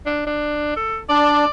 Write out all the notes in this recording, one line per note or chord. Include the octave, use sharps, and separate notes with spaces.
D4
D4
A4
D4 D5